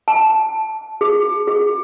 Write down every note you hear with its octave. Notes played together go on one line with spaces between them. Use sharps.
A5
G#4
G#4